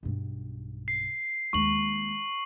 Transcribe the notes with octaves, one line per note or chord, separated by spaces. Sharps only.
B1 G2
C7
D#2 G#3 C#6 F#7